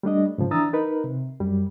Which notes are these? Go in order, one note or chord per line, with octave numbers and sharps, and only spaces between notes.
G3 A3 D4 D#5
G#2 C#3 F3
E3 D4 A#5 D#6 E6 A6
D#4 A#4 B4
C3
F#2 G3